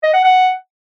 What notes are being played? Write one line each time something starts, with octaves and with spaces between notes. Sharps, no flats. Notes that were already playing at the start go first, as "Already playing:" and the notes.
D#5
F#5
F#5